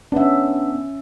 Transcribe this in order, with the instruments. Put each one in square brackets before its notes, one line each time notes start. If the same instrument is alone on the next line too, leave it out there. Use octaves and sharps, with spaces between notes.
[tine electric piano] B3 D4 [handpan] C#4 E5